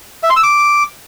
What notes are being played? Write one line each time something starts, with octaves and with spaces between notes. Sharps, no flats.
E5
C6
E6
D6